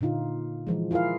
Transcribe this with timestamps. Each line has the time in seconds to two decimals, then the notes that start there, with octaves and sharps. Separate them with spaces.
0.01 A#2 D3 D#4 F4
0.67 E3 F3 G#3
0.91 E4 F4 G#4 A#4 F5